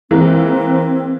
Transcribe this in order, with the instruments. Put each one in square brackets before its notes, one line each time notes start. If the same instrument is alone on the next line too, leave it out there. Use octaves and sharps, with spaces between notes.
[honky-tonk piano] E3 G#3 A#3 [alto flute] C4